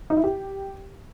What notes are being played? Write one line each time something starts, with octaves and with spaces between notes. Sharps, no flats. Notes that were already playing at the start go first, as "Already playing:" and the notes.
D#4
E4
G4